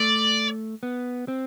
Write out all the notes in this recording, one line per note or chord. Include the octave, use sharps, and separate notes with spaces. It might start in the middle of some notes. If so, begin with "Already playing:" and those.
Already playing: A3 D5
B3
C4